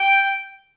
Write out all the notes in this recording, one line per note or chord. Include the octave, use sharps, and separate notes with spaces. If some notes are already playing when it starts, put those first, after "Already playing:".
Already playing: G5